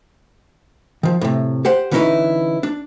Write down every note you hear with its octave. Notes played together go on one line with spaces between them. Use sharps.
D#3 F3
A2 C3
G4 C5 F#5
D3 E3 C#4 D#4 E4 B4
D4